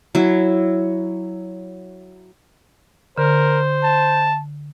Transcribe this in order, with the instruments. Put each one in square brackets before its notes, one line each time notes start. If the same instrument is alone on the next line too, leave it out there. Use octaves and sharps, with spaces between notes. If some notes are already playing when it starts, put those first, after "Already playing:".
[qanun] F#3 E4
[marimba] D3 [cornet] A#4 [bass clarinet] C5
[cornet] A5